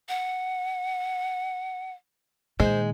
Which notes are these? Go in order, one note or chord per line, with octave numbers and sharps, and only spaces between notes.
F#5
A#2 D#3 G#3 C5